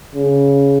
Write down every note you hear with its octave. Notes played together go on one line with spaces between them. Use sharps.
C#3